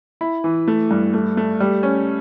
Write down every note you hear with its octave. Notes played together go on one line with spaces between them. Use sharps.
E4
E3
A3
G2
A3
A3
G3
C#4